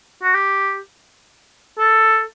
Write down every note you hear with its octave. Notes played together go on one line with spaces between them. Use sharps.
F#4
G4
A4